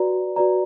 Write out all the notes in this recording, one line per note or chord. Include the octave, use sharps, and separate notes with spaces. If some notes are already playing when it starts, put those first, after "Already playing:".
Already playing: F#4 B4 D5 A#5
F#4 B4 D5 A#5